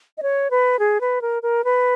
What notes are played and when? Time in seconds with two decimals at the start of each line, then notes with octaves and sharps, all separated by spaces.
0.18 D#5
0.23 C#5
0.51 B4
0.79 G#4
1.01 B4
1.22 A#4
1.43 A#4
1.64 B4